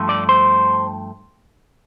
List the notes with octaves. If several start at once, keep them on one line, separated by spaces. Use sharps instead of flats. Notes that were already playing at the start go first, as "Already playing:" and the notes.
Already playing: G2 F3 A3
D5
C5